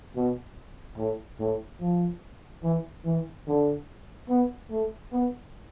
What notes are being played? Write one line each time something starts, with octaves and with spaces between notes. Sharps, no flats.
B2
A2
A2
F3
E3
E3
D3
B3
A3
B3